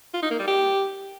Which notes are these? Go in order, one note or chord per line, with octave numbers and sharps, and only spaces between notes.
F4
D#4
A#3
G3
G4